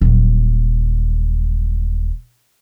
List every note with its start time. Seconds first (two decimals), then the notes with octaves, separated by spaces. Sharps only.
0.01 D#1 F#3